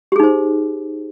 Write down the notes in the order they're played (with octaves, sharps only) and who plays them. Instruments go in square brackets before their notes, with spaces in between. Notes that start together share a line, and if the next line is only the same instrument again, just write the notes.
[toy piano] G4
G#4
D#4
C5